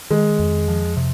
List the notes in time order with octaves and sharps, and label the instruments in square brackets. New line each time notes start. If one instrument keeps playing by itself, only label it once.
[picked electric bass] D#3 [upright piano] G#3
[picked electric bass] F2
F3
C3